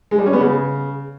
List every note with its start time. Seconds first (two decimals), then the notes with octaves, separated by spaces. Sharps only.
0.11 G#3
0.19 G3
0.26 C#4
0.33 B3
0.41 C#3